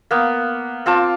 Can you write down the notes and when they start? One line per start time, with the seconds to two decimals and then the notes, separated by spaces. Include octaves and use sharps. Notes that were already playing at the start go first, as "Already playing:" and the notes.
0.11 A#3 B3
0.86 C4 F4 A5 D6